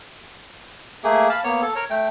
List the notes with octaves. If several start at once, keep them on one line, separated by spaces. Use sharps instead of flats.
A3 A#3 G#4
F5 A5 B5
A#3 B3 C#5
A4
A#4 C#5
A3 G5